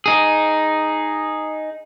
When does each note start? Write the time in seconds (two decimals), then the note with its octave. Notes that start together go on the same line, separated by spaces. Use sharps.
0.06 D#4 G#4